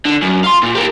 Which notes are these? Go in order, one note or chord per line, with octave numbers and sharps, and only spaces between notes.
D3
F#2
F5 C6
A#2
G4 A#4